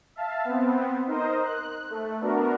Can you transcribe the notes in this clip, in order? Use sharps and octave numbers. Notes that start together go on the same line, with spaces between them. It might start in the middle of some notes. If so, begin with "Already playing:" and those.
E5 F5 A5
B3 C4
D#4 A#4 C5 D#5
F#6
A3
B3 D4 F#4 A#4